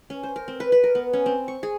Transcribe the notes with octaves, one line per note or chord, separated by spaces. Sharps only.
C#4
C5
A#4
C4
B4
B4
A#4
B3
C#4
C4
C#6
G#4